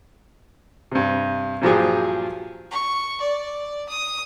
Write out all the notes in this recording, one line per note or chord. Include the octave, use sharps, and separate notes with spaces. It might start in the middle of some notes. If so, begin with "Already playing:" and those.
G2 C3
G2 A#2 F3 F#3 G4 G#4
C#6
D5
D#6